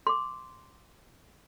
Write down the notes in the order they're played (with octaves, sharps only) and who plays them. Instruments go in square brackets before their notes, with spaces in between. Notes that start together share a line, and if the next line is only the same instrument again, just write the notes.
[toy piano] C6 D6